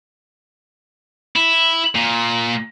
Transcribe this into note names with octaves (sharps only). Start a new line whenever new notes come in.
E4
A#2